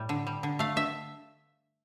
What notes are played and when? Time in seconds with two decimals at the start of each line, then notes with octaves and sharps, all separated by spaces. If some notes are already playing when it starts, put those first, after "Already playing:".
Already playing: A2 G3
0.09 D3
0.27 G3
0.43 D3
0.59 A3 F5
0.76 D3 E5